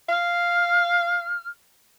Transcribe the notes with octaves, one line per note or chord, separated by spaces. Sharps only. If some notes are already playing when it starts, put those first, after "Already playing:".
F5 F6